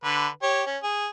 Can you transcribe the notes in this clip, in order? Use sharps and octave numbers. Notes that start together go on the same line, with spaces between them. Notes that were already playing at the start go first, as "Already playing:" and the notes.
D3 B4
G4 C#5
C#4
G#4